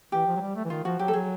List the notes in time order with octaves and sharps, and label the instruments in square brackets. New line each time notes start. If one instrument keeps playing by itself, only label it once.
[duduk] E3 [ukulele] G4
[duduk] F3
F#3
G3
A3
E3
[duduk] D#3 [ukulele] F4
[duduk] F3 [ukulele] F#4
[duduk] F#3 [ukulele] G4
[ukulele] A4
[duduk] F#3 [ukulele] G#4